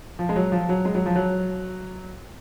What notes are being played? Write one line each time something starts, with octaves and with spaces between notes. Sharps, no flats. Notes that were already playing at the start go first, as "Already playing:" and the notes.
F3
G#3
F#3
F3
F#3
G#3
F#3
F3
F#3